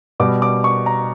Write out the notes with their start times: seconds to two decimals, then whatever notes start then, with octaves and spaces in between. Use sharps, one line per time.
0.20 B2 G3 D6
0.42 D6
0.64 C#6
0.86 A#5